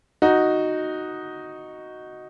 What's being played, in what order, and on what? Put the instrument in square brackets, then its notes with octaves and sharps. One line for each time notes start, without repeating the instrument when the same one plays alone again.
[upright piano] D#4 F#4